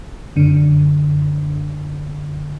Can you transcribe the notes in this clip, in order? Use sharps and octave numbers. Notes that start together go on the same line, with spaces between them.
F#2 D3